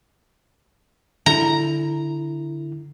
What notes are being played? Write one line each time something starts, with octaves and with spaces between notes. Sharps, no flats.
D3 E4 A#5